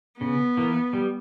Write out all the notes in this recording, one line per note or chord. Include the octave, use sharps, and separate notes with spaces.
C#3 B3
E3 A#3
G3